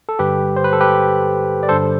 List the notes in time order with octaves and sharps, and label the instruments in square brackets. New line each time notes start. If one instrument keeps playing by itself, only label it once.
[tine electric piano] A4
G2 D3 G3 G4 B4
C5
B4
A4
G4 B4
D5
G2 D3 G3 A4 C5